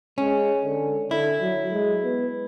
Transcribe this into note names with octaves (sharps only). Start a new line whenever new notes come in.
G#3 C#4
D3
D3 E4
F#3
G#3
B3